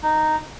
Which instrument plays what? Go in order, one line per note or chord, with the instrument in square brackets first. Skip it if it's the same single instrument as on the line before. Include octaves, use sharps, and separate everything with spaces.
[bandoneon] D#4